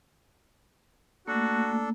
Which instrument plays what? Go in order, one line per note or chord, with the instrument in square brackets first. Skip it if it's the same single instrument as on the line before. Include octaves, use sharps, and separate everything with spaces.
[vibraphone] A3 A#3 [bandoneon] D4 A4 [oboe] F#4